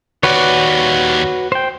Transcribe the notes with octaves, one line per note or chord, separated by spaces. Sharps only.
D#2 F#4 B4 C#5 D5
C5 G5